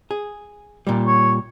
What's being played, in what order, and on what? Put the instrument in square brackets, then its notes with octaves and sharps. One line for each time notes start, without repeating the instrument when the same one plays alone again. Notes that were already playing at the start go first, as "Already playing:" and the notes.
[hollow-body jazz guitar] G#4
A#2 G3
[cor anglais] C#5